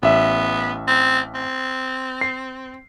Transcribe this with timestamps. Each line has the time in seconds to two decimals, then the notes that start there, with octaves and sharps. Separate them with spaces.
0.03 A1 B3 E5
0.87 C4
1.35 C4
2.21 C7